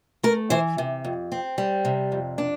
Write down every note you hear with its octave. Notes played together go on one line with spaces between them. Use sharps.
A3 A#4
E3 C5
C3
F2
C4
G3
C3
F2
D4